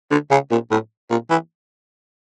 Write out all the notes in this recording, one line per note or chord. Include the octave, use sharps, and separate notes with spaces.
D3
C#3
A#2
A2
A#2
E3